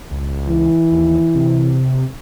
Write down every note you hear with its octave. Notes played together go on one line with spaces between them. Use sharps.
C#2
E3
D#2
C3